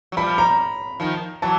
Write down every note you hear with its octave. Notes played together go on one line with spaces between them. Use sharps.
F#3
F3 G3 B5
A#5
D#3 F3
E3 F#3 A5